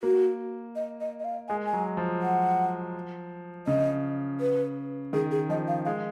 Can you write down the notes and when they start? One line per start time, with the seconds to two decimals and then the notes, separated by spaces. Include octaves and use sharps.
0.03 A#3 F#4
0.76 D#5
1.01 D#5
1.20 D#5
1.25 F5
1.48 G#3 G#5
1.65 G#5
1.73 F#3
1.97 F3
2.22 F#5
3.67 C#3 D#5
4.41 B4
5.13 D#3 G#4
5.31 G#4
5.49 F3 D#5
5.68 F5
5.85 G#3 F5